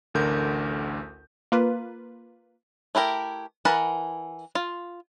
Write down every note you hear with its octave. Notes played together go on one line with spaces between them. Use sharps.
A1 D2 D3 A#4 G6
A#3 F4 B4
A3 E4 G4 A#4
E3 A#4 F#5 A5 B5
F4